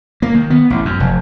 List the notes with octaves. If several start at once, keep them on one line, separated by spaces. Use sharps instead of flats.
A#3
D#3
B3
A1
F#2
F1